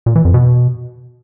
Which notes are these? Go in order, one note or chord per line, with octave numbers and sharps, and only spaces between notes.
A#2
E3
F2
B2